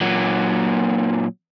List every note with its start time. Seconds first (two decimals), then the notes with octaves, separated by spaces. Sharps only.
0.01 A#2 F#3